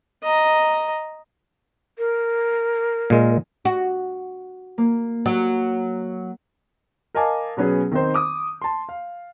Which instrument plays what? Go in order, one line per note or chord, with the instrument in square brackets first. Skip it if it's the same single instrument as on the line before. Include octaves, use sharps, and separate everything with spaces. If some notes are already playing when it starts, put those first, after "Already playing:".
[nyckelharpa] D#5 A#5
[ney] A#4
[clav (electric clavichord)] A#2 G#3
[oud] F#4
[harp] A#3
[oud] F#3
[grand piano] A#4 D#5 F5 G#5 A5 D6
B2 F#3 B3 C#4 G#4
D#3 C4 D#4 C5
D6 D#6
A5 C6
F5